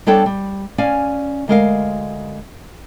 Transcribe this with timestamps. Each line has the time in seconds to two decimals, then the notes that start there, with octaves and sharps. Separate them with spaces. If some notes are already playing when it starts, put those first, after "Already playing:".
0.07 G3 B3 D4 A4 C#5 G5
0.26 G3
0.78 C#4 D5 F5 G#5
1.48 D2 G#3 A#4 F5